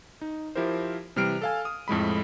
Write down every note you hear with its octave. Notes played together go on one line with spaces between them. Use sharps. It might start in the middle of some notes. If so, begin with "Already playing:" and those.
D#4
F3 E4 G4 A#4 C5
C3 E3 G3 F6 C7 D7
A4 F5 G#5
D#6
F2 A2 G#3 B5